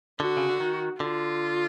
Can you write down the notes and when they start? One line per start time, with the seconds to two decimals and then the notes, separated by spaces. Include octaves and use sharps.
0.20 D3 F#4
0.37 C#3
0.49 D3
0.60 D#3
1.00 D3 F4